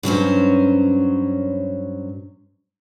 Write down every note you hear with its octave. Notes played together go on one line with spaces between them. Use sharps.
G2 F#3 C#4 C5